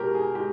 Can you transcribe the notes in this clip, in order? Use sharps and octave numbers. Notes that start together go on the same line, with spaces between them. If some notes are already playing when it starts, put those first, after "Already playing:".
Already playing: B2 G#3 G4 A#4
G#4
G#3 G4